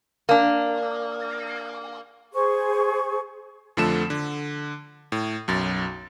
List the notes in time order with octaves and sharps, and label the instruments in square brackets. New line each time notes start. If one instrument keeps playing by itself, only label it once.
[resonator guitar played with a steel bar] A#3 D4
[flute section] G#4 C5 C#6
[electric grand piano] F2 D3 F3 A3 A4 E7
D3
A2
B1 F#2 A6